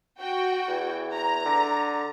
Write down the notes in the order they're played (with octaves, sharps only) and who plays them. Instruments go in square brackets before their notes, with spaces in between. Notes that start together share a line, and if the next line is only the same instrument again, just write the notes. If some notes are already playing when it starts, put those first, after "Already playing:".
[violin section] F#4 G5
[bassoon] E2
[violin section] A#5
[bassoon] D3